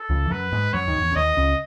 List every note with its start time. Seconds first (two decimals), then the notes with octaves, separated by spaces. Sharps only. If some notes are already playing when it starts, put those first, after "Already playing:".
Already playing: A4
0.09 C#2 C#3
0.25 E3
0.31 F#2 F#3 B4
0.52 G#2 G#3
0.73 F#2 F#3 C#5
0.87 D#2 D#3
0.95 F#2
1.01 E2
1.11 C#3
1.16 D#2 D#3 D#5
1.37 C#2 C#3